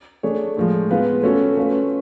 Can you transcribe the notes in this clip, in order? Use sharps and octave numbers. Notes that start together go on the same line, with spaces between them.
A3 D4 G#4 C#5
A2 F3 G#3
G#3 B3 F4 B4
A3 C#4 F#4 A4 C#5
A3 C#4 F4 B4